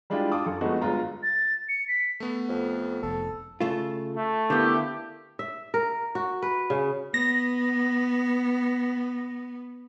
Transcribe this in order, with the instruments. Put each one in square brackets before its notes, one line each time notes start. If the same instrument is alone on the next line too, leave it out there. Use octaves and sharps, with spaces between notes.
[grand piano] G3 G#3 D4 E4 F4 G4
F4 A5 D6 D#6
F#2 F4 A4
F3 G#3 A3 B3 D#4 F#4
G1 G#3 F4 A#5
[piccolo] A6
C#7
B6
[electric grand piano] A3 B3
[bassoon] F2
[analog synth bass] F1 [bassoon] A4
[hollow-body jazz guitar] C#3 A3 F4
[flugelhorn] A3
[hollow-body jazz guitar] D3 B3 [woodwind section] A#3 E4 G4
[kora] E5
A#4
F#4
B4
C#3
[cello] B3 [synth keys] A#6